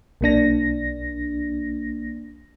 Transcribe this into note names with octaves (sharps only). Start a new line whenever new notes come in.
B1 A#3 D4 A#6